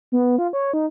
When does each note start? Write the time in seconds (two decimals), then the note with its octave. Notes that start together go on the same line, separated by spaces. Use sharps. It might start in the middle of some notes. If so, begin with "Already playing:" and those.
0.12 B3
0.38 F4
0.53 C#5
0.74 D#4